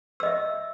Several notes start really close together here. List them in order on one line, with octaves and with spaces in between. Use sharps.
E6 D#5 E5